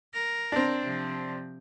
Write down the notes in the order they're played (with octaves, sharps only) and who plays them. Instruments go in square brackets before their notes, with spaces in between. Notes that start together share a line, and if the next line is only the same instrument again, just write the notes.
[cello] A#4
[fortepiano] C4 D4
[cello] C3 F3